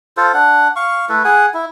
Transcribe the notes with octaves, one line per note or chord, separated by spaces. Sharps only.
F4 A4 C5
D4 F#5
F5 C#6
A3 E4 A4 B4
G#4 F#5 G#5
E4